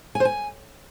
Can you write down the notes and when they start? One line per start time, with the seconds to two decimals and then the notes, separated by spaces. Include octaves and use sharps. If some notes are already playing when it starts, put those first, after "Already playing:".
0.15 G#5
0.20 C5
0.25 G#5